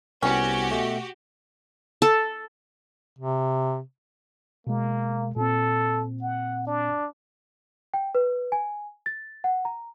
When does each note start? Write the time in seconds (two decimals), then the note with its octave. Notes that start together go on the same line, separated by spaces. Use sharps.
0.22 C2 B3 C#4 F#4 G4
0.71 B2 A3
2.02 A4
3.19 C3
4.67 B2 G#3 A#3
5.36 A#2 C4 A4
6.21 F#5
6.67 D4
7.94 G5
8.15 B4
8.52 G#5
9.06 A6
9.44 F#5
9.65 A#5